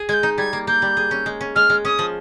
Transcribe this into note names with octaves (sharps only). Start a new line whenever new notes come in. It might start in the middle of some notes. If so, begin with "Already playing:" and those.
Already playing: G#4
G#3 G6 G#6
D#4
G3 G#6
A#3
A#3 G6
G3
G#4
C#4
G#3
C#4
G#3 F6
G#3
C#4 D#6
F3